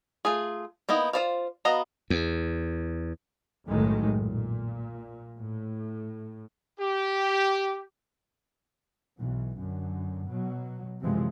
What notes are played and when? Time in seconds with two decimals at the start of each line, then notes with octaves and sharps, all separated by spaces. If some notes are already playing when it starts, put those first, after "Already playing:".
0.25 A3 F4 G#4
0.89 A#3 B3 D#4 E4
1.13 F4 B4 C5 D5 F5
1.65 B3 F#4 D#5 F5 A#5
2.10 E2
3.67 B1 F#2 A2 D#3 G#3 A3
4.21 A#2
5.38 A2
6.80 G4
9.18 B1 E3
9.57 F#2 D3
10.28 B2 F#3
11.01 F#2 C3 E3 F3 G#3